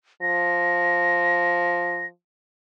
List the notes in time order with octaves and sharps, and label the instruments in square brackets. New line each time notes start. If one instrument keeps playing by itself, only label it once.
[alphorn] F3 [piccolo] A#6